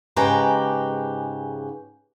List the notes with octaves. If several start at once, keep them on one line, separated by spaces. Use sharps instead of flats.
G#2 C#3 G#3 G4 B4 A#5